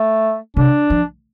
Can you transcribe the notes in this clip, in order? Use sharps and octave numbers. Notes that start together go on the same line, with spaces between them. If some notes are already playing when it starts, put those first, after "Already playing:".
Already playing: A3
C3 D4
F3